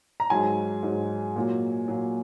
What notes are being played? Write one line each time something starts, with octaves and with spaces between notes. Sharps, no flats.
A#5
G#2 F#3 G#5
G#2 F#3
A#2 F#3
A#2 F#3